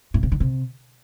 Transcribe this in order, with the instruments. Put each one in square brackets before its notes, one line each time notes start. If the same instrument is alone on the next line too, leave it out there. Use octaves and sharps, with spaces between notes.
[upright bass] A2
C3
D3
C3